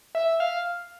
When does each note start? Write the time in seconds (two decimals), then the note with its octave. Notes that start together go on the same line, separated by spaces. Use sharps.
0.15 E5
0.40 F5